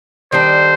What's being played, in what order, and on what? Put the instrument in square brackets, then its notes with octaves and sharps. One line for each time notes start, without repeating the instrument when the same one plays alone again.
[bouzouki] D#3 G3 D4 A4 [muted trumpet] C5